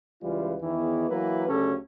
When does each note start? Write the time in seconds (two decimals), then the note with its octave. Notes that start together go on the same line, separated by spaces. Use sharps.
0.22 C#2 E3 G3 F4
0.61 E2 D#3 E3
1.09 E3 F#3 A#3 E4 A#4 B4
1.48 D2 C#3 F#3 C#4 G4 A4